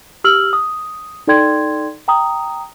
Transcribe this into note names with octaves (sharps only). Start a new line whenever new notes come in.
G4 E6 F6 F#7
D#6
D#4 A4 D5 G5 C6 G#6
G5 A#5 D#6